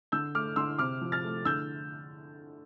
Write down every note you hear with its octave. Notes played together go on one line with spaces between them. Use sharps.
D3 E6 G6
A3 D6 F6
D3 C6 E6
C3 D6 F6
F3
F6 A6
A3
D3 E6 G6